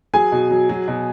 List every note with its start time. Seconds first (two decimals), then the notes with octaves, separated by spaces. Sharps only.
0.14 F#3 G#4 G#5
0.32 B2
0.51 F#3
0.69 F#3
0.88 B2